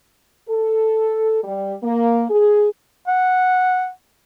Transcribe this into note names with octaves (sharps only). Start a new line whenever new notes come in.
A4
G3
A#3
G#4
F#5